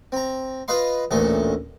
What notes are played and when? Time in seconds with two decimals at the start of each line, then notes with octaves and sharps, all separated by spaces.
0.12 C4 A#5
0.68 F4 B4 D#5 F5 C6
1.11 A1 D2 A#2 A3 A4